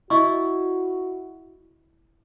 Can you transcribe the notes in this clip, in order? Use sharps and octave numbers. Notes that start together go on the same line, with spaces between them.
E4 F#4 D#5 C#6